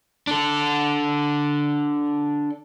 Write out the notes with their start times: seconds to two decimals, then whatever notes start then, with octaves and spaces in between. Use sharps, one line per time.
0.27 D4 A4